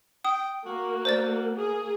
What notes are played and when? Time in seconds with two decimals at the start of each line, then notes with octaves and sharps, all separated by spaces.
0.25 G5 D#6
0.66 A#3 F#4
1.05 C5 D5 A6
1.56 A#3 G#4